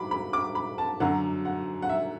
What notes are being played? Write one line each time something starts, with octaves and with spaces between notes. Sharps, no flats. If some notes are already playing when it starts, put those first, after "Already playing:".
Already playing: F#3 B5 D6
B5
D6
B5
A5
F#2 D3 F#3 F#5
F#5
F#5
E5